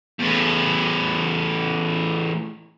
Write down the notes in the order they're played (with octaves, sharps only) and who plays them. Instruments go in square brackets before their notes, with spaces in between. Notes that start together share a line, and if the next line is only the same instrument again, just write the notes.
[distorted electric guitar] E2 A2